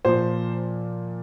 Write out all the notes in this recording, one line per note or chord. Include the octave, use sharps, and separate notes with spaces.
A#2 F3 C5